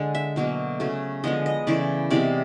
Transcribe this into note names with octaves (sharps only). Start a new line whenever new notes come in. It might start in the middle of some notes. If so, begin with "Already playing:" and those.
Already playing: D3 G#3
E5
B2 F#3 A#3
C#3 F#3 A3
D3 F3 G#3 B3 D#5
D#5
C#3 E3 A3 D5
C3 E3 G#3 B3 D5